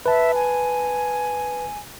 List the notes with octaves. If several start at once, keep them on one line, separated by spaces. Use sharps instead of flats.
B4 E5 A5
G#5